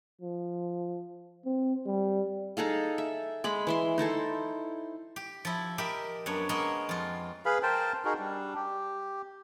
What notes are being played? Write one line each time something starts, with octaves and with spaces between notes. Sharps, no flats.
F3
C4
G3
D#4 G#4 A4 F5
E5
G#3 G#4 B5
E3 E5 C6
D#4 E4 A4 C5
G4
F3 E4
G4 A#4 D#5 E5 B5
F#2 B3 D4 C#5
G#3 A#3 B3 A#4 C#5 D#5
F2 F4
G#4 B4 F5 B5
A#4 C5 G5 A5
D#4 F#4 G#4 A#4
G3 D4
G4